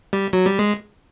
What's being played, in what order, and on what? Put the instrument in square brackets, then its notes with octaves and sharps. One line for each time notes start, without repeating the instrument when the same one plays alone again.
[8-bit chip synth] G3
F#3
G3
G#3